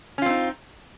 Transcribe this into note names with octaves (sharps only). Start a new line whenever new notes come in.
C4 C#4 D#4 F4